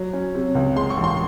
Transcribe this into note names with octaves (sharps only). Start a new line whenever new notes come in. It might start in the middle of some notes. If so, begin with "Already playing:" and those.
Already playing: F#3
C#4
C3
C#2
G#3 C6
C#6
A1
C6